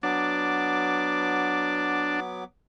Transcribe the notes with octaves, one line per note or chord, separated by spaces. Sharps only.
F#3 B3 D4 D6